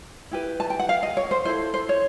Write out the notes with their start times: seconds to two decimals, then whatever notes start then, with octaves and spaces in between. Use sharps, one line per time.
0.32 E4 G4 B4
0.60 A5
0.70 G5
0.79 F#5
0.89 F5
1.03 D#5
1.17 C#5
1.31 C5
1.45 E4 A4 C5
1.74 C5
1.89 C#5